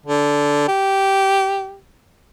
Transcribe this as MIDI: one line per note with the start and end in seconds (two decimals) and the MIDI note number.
0.06 0.65 50
0.68 1.77 67